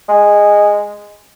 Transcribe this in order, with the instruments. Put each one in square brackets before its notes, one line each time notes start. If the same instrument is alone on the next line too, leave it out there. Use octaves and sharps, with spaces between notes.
[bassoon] G#3